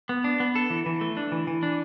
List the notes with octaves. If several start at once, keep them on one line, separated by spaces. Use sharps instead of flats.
B3
D4
B3
A4
E3
E3
A3
D4
E3
E3
D4